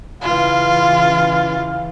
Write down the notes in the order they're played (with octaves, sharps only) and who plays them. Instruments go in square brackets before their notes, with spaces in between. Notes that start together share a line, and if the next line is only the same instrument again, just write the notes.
[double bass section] C#3 E3 [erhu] F4 [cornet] F5